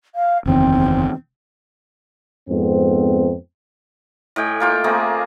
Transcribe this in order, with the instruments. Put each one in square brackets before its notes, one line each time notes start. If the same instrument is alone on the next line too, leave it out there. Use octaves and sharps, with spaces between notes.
[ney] F5
[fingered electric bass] F#1 E2 D#3 [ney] C4
[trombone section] F2 G#2 B3 C4
[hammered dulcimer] A2 D#5 G5 G#5
A#3 F4 G5
A3 A#3 C4 G#4